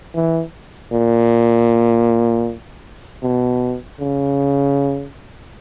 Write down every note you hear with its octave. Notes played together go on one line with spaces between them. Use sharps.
E3
A#2
B2
C#3